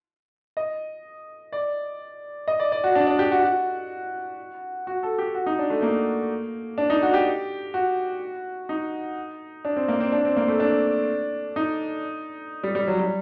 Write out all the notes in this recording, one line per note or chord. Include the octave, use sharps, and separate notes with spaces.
D#5
D5
D#5
D5
D5
F#4
D4
D4
G4
F#4
F#4
F#4
A4
G4
F#4
D#4
D4
A3
A#3
D4
D#4
F#4
G4
F#4
D#4
D4
C4
A#3
C4
D4
C4
A#3
A3
D4
D#4
G3
G3
F#3
G3